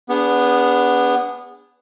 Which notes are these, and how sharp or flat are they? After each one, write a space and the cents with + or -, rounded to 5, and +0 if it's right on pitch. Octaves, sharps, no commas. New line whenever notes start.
B3 +0 D4 -30 G#4 -30